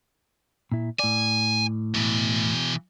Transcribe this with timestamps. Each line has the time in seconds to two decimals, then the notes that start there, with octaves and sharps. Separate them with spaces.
0.72 A#2 E4
0.99 A2 D5 G#5
1.94 B2 E3